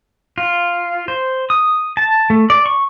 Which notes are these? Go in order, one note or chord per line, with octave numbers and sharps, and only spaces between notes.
F4
C5
D#6
A5
A3
D5
C#6